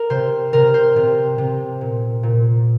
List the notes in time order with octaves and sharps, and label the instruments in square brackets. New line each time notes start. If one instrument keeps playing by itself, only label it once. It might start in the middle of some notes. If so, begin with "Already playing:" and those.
Already playing: [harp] A#4
C3 C5
C3 A#4
C5
C3
C3
A#2
A#2